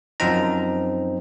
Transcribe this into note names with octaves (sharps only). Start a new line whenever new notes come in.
F#2 F3 C4 D#4 A#5